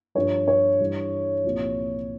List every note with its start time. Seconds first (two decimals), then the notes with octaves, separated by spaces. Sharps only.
0.15 G2 F3 C#5
0.48 C#5
0.80 G2 E3 G3
1.44 C2 A#2 F3